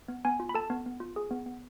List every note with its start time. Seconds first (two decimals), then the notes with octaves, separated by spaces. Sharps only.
0.08 B3
0.25 B3 G#5
0.40 F4
0.49 B5
0.55 A4 A5
0.70 B3
0.86 B3
1.00 F4
1.16 G#4
1.31 B3
1.46 B3